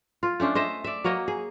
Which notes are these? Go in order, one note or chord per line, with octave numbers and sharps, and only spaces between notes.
F4
A3 C#4 D4 C5
C5 D#5 E5
D5 E5
F#3 A#3 C#5 D#5
G#4